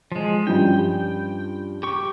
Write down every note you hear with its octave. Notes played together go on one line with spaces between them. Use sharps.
F3 G#3
G2 F3 C#4 G5
G4 C#6